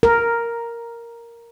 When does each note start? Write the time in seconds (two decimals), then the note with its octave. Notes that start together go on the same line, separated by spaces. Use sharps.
0.03 A#4